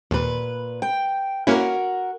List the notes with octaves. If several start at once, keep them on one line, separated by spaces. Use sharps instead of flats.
D#2 A#2 B4
G5
A#3 C#4 E4 F#4 A#4